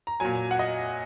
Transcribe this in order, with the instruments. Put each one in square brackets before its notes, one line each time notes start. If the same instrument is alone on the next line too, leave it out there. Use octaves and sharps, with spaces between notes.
[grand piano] A#5
A#2 F#3 G#5
F#5
D#5